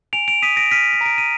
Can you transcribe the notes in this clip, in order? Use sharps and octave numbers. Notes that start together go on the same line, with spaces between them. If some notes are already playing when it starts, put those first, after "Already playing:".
G#5 D7 F7
D7 F7
D#6 B6 D#7
A#6 D7
F6 B6 D#7
B6
A#5 D7
D#7